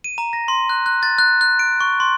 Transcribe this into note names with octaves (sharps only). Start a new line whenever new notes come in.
D#7
A#5
A#6
C6
F#6
F#6
A6
F#6
F#6
D7
C#6
C6